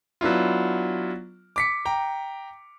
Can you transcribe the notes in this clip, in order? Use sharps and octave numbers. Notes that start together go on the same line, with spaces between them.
F#3 B3 D4 E4 F4
D6 B6 C#7
G5 A#5